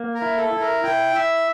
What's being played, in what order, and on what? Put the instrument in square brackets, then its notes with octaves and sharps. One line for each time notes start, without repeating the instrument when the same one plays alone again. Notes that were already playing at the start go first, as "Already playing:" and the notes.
Already playing: [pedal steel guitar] A#3
[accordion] A#4
[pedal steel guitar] E4
[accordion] A4
[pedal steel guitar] E4
[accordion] A#4
[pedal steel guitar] E4 [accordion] G5
[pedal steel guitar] E4 [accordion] E5